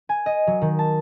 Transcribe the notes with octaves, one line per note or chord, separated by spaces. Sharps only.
G#5
D#5
F#3
D#3
A5